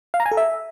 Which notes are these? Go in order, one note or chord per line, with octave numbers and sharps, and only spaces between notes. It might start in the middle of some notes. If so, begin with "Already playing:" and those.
F5
A#5
G#5
A4
E5